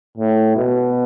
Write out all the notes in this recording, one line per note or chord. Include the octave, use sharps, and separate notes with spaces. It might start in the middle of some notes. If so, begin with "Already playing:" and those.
A2
B2